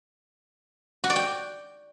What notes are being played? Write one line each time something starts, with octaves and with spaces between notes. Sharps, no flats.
F#4
D5
G5